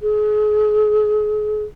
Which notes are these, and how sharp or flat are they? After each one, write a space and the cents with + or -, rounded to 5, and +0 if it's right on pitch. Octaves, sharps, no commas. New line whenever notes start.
G#4 +35